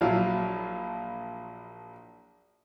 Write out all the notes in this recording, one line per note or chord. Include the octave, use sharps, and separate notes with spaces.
A#1 F3 F#3 E4 F4 F5